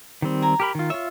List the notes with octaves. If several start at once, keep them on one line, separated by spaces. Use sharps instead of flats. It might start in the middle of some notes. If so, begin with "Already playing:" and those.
D#3 G3 C4
G#5 A#5
G4 A#4 B5
D#3 F4
F4 C#5 E5